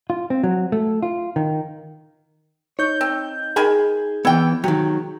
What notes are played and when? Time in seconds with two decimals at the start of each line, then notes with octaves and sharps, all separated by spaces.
0.10 F4
0.30 C4
0.43 F#3
0.72 A3
1.03 F4
1.36 D#3
2.79 D#4 C#5 G6
3.01 C4
3.56 D#3 G#4 G#5 B5
4.25 E3 B3 E4 G5
4.64 D#3 F#3 G4